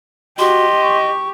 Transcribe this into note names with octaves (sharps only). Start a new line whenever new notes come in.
F#4 G4 D#5 C6
C#6